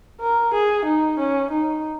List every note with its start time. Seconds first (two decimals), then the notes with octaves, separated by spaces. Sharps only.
0.20 A#4
0.53 G#4
0.85 D#4
1.18 C#4
1.51 D#4